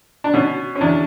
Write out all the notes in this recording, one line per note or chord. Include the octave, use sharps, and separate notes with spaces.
D4
B2 C#4
C#4
E2 D4